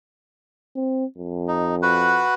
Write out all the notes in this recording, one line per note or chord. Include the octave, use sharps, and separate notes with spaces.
C4
F2
D#4
F#4 B4 F#5